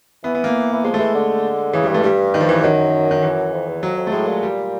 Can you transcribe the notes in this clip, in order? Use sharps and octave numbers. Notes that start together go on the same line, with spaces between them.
E3 B3
B3
A#3
E3
F3 G#3
A3
E3 G#3
D3
C#3 E3
G3
G2
A3
G2 G3
D#3
F3
E3
F#2 D#3
D#3
E3
F2
E2
F2 F#3
F2
A3
A2 G#3
A#2
G3